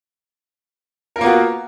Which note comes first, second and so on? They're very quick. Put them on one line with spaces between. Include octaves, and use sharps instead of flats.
A#4 F4 A#3 B3 F#4